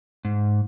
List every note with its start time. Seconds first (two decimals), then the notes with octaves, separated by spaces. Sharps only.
0.25 G#2